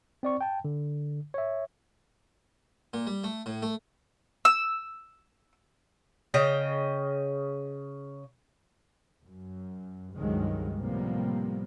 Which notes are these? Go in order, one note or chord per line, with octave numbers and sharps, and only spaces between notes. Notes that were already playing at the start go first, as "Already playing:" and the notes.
C4 D5 C#6
G5 A5
D3
C#5 E5
A#2
G3
A3
A2
A3
E6
C#3 D#5 G5
F#2
C#2 G2 C3 D#3 F#3 G#3
A2 C3 F3 G3 A#3 B3